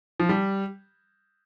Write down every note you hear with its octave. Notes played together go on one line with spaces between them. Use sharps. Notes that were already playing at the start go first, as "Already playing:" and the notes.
F3
G3